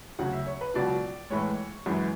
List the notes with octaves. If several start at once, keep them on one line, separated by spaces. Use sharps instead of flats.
D2 C#3 F#3 F#5
E5
C#5
B4
C#2 B2 F#3 D5
A2 E3 G#3 C#5
F#2 E3 G#3